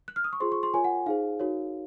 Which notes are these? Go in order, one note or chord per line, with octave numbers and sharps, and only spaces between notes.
F#6
F6
D#6
C#6
F4 G#4 C5 C6
C#6
C6
F4 A#4 C#5 G#5
F#5
D#4 G#4 C5 F5
D#4 F#4 A#4 C#5